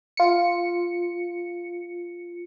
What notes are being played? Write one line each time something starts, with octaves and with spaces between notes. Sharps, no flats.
F4 C#7